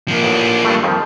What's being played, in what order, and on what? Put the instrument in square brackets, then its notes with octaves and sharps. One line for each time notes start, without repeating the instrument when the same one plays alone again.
[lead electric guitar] F3 A#3
[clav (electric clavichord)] A1
G2 A3
F2 D#3 F3